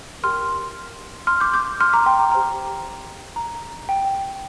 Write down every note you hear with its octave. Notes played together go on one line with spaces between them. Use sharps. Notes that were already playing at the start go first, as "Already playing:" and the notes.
G4 A#4 G5 C6 F6
C6 F6
D6 G6
D6 G6
C6 F6
A#5 D6
G5 C6
A#5
G4 C5 G5 A#5
A#5
G5
G5